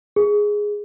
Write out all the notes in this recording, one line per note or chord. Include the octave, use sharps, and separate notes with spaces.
G#4